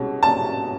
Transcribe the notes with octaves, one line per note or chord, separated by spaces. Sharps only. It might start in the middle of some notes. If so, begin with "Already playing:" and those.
Already playing: C2 B2 G#3 C#4
A5